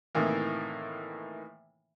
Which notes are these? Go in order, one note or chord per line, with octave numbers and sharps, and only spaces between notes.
A2 C3 D#3 E3 A#3